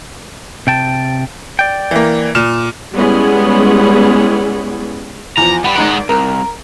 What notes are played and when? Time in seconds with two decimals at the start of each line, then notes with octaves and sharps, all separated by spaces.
0.67 C3 G5 A5
1.59 D5 G5
1.91 E3 A#3
2.35 A#2 F6 E7
2.93 G3 G#3 B3 C#4 E4 G#4
5.37 E2 F3 A#5
5.64 G3 B4 F#5 B5
5.76 G#1 G#3 D#4 F#5 D7
6.09 C2 A#4